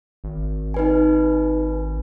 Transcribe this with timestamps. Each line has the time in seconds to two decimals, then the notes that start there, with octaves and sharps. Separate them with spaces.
0.24 G#1
0.74 D#4 B4 G#5